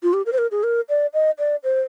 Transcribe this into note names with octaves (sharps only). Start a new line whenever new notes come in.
F4
G4
A#4
C5
A#4
G#4
A#4
D5
D#5
D5
C5